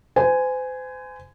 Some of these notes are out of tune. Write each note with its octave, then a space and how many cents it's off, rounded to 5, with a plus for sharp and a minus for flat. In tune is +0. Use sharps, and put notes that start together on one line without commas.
C5 -40 G#5 +0